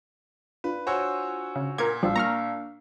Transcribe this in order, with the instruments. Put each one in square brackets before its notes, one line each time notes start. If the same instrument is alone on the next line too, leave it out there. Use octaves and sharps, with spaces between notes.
[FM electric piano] D4 F4 [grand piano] B4
[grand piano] F#4 C5 C#5 [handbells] F#5 G#5 E6
[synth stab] C#3
[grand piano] A#2 [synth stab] A#4 G#6
[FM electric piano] A1 [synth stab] F3 G3 [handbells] D4 F5 E6
[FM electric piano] A#3 [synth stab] A#5 C#6 F6